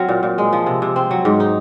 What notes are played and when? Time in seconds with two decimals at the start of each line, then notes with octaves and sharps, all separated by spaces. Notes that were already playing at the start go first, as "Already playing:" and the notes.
Already playing: F#3 C4 F5
0.09 A#2
0.23 A#2
0.38 G#3
0.53 F3
0.66 C3
0.82 C3
0.96 C4
1.11 F#3
1.25 G#2
1.40 D#4